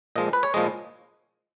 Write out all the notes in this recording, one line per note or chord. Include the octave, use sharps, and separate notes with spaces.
A#2 F3 G#3 D#5
B4
C#5
A#2 F3 G#3 D#5